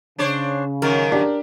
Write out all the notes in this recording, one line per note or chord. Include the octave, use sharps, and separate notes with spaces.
C#3 D4 C5 C#5
F#2 D#3 F#3 A#4
D4 G4